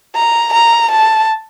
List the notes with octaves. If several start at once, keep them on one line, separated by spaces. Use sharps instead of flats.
A#5
A#5
A5